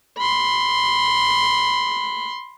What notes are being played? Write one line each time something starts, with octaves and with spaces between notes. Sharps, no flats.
B5 C6